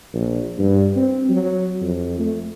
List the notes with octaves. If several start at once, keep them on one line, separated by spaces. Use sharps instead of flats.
A#1
G2
C4
F#3
F2
A3